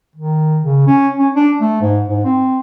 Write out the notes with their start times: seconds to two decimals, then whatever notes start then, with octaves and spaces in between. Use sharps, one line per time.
0.16 D#3
0.64 C#3
0.86 C#4
1.18 C#4
1.35 D4
1.60 A3
1.81 G#2
2.08 G#2
2.24 C4